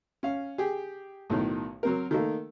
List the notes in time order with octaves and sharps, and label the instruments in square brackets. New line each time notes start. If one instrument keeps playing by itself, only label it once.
[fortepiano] C#4 F5
G4 G#4
B1 A2 D#3
F#3 C4 A#4
D#3 A3 A#3